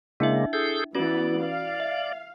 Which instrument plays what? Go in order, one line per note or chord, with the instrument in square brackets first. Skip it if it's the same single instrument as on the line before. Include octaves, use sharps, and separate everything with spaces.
[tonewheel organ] C#3 G#3 A#3 [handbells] D4 E4 E5
[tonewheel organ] G#4 A4 G6
[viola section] E3 B3 [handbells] C#4 F#4 B4 [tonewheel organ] D5
[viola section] F5
[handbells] E5